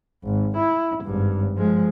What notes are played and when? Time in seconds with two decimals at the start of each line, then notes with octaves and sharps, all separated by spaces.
0.24 G#1
0.57 E4
1.04 G#1 G2
1.56 F3 G#3